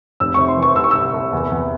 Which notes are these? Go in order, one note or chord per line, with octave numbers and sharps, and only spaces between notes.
F1 E6
C3 C#6
C6
E3
C#6
C2 E6
C#6
C2 E6
C2
E2
E2